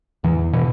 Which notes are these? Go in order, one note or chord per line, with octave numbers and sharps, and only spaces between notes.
E2 E3
B2 E3